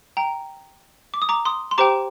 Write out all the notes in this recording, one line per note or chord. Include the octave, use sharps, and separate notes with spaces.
G5 A#5
D6
D#6
A#5 D6
C6 D#6
C6
G4 C5 G5 A#5 D6